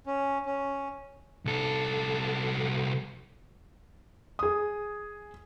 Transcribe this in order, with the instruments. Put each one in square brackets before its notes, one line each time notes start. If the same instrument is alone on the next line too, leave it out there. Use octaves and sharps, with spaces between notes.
[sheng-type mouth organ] C#4
C#4
[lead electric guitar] C2 A4
[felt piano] G#4 D#6